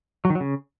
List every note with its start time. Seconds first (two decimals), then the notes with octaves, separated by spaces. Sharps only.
0.25 F#3
0.30 D#3
0.35 F#3
0.40 C#3